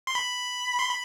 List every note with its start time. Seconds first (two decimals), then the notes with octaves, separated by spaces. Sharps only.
0.07 C6
0.15 B5
0.79 C6
0.90 B5